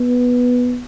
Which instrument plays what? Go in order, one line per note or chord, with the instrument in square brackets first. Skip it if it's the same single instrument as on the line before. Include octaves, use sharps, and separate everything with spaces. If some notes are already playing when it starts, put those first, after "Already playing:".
Already playing: [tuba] B3